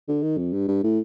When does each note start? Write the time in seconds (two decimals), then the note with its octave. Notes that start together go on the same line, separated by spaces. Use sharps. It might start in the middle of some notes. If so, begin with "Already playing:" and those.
0.08 D3
0.23 D#3
0.38 F2
0.53 G2
0.68 G2
0.84 A2